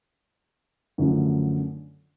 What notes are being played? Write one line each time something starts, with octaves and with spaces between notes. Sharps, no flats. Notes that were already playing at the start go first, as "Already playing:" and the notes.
F#2 D3 F3 A3